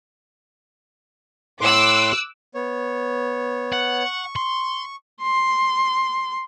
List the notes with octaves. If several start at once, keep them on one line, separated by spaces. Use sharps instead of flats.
A2 C6 D6 E6 F#6
B3 C#5
F#5
C#6
C6
C6